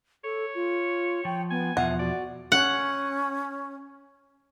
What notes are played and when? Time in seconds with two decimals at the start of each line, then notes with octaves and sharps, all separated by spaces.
0.24 A4 C#5
0.55 F4
1.25 F3 G5
1.51 B3 G#5
1.77 E2 B2 F3 E5 F#5
1.99 F#4 D5
2.52 C#4 F#5